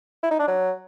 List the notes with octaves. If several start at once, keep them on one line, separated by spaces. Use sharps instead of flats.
E4
D#4
D4
F#3